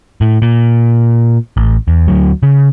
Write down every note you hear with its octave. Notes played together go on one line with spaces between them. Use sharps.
A2
A#2
A1
E2
D2 F#3
C#3